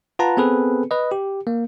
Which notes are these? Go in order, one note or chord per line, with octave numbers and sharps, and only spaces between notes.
F4 B4 F#5 A5 A#5
B3 C4 G#4 A4 B4
B4 D#5
G4
A#3